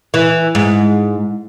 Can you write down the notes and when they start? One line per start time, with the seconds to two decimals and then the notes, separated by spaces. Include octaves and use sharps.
0.14 E3
0.55 G#2